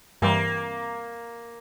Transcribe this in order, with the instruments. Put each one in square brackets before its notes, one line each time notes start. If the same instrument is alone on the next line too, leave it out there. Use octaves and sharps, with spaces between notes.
[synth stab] G2 E3 G3 C4 [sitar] A#3